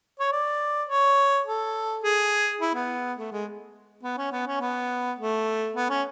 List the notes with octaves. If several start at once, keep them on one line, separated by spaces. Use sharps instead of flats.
C#5
D5
C#5
A4
G#4
E4
B3
A3
G#3
B3
C#4
B3
C#4
B3
A3
B3
C#4